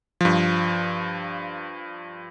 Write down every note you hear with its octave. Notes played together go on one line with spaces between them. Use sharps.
G2 F3